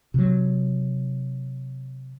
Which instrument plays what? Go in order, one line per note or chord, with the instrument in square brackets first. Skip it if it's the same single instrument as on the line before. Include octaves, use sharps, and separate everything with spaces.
[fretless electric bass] C3 F#3